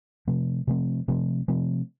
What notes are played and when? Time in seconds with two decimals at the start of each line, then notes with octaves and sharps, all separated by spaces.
0.28 C3 F3 A3 C4
0.67 C3 F3 A3 C4
1.08 C3 F3 A3 C4
1.48 C3 F3 A3 C4